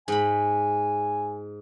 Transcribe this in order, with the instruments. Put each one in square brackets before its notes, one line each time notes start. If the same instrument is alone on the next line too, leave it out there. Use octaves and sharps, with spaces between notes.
[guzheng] G#2 B5 [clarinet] G#5